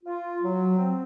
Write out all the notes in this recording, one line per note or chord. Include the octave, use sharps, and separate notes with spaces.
F4
F#3
C4